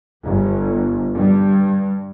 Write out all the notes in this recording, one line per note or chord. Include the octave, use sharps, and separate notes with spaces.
G1
G2